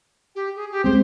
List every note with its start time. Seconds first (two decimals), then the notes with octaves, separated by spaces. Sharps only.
0.35 G4
0.55 G#4
0.71 G4
0.84 G#3 C4 C5